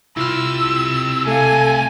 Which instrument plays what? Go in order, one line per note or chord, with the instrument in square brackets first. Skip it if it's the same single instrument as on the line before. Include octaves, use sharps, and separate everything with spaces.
[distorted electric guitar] C2 C3 [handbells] E4 F4 F6 [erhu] E6
[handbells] A3 F5 [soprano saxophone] A4 [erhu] G#5